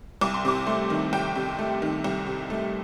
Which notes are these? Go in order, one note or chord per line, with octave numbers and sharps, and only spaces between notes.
C2 D6
C6
C3 D6
A3 C6
D#3
C2 G5
C3
A3
D#3
C2
C3
A3